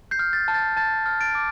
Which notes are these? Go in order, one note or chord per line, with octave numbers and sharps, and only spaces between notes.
G6 C7
F6
A6
A5
A6
A5 A6
F6
A6 D7
D6